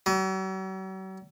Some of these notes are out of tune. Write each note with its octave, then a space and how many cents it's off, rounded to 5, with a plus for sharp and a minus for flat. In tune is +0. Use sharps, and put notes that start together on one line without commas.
F#3 +45